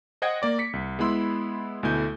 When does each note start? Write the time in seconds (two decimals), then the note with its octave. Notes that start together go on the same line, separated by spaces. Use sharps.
0.22 C5 D#5 F#5 G5 G#6 A#6
0.42 A#3 D5 D6
0.59 D6 B6 C#7
0.73 C2
0.99 G#3 B3 E4 B5 C6 E6
1.83 D2 B2 A3 E4 G#5 G6